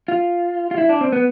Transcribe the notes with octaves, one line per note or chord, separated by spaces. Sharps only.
F4
F4
E4
D4
C4
B3